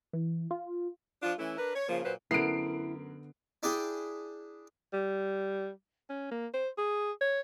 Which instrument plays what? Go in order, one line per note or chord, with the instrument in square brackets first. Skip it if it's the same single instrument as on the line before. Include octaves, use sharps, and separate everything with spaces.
[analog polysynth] E3
F4
[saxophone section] F3 D4 F4
E3 A3 C#4 E4
D4 A#4 B4
C#5
C#3 F3 A#3 F4
A#2 F#3 B4 C5
[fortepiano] F#2 A#4 [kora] D3 B3 [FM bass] E4 [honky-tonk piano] C7 D7
[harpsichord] D4 E4 G#4 D5 G5
[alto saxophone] G3
C#4
A#3
C5
G#4
C#5